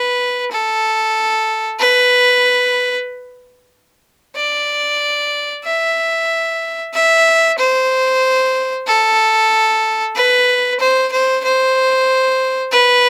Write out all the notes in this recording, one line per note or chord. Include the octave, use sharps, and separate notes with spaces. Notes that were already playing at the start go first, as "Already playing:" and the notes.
Already playing: B4
A4
B4
D5
E5
E5
C5
A4
B4
C5
C5
C5
B4